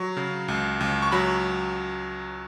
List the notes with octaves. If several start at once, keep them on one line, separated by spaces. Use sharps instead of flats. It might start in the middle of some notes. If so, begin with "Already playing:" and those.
Already playing: F#3 C#6
C#3
C#2
C#2
C#6
F#3 B5